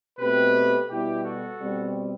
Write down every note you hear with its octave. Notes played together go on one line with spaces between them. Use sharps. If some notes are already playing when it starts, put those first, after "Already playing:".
B2 A3 C4 G4 B4
B2 G3 B3 E4 G4
F#4 A4
B2 G3 C4